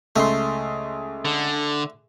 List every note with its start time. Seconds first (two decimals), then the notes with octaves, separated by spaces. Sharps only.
0.16 C#2 A3 C6
1.25 D3